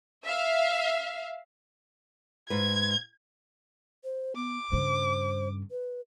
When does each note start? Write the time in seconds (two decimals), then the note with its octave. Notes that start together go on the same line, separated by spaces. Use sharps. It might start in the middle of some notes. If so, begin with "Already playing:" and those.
0.24 E5 F5
2.50 G#2 B4 G#6
4.04 C5
4.36 B3 D6
4.72 G2 C#3 C5
5.71 B4